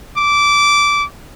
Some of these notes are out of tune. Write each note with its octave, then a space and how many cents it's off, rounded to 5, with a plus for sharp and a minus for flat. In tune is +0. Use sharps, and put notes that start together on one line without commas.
D6 -15